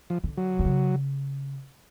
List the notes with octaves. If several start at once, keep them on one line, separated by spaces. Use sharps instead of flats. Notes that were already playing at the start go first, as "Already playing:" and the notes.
F3
D3
F#3
D3
C#3